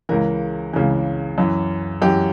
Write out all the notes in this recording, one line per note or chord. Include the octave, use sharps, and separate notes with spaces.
C#2 C#3 E3 A#4
C#2 C#3 E3
F#2 E3
F#2 E3 G4